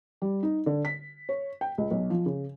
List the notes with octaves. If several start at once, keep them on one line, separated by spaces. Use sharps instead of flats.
G3
D#4
D3
B6
C#5
G5
C#2
B1
F3
C#3